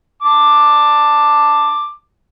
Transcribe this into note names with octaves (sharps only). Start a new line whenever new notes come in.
A5 D6